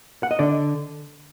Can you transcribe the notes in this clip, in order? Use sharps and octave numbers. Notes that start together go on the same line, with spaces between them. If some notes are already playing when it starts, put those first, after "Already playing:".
F#5
D#5
D3 D5